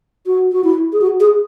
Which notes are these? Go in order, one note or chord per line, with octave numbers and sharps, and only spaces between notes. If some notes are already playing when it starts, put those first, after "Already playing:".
F#4
F#4
E4
G#4
F#4
G#4